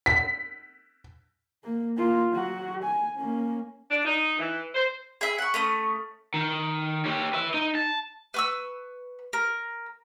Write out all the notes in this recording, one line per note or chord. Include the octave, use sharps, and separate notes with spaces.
B6
A#3
A#3 F4
F#3 F#4
G#5
A#3 C#4
D4
D#4
E3
C5
G#4 E5
F#5 C#6
A3 C#4 D#6
D#3
G4 C#5
B4 E5
D#4
A5
B4 C#6 E6
A#4